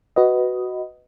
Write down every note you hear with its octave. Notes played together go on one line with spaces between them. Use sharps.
F#4 B4 D#5